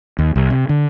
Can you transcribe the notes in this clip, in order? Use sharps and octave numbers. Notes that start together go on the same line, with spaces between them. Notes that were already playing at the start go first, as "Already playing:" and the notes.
D#2
C2
C3
D3